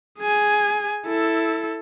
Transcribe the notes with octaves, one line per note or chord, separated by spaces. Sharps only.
G#4 G#5
E4 A4